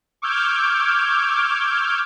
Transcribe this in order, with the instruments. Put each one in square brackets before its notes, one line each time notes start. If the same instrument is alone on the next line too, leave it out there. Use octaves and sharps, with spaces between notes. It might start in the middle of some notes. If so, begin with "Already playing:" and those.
[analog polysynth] C#6 D6 E6 F6 G6 G#6